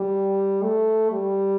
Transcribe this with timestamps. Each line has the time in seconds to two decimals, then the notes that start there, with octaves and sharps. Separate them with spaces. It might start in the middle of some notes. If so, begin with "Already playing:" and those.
Already playing: G3
0.63 A3
1.12 G3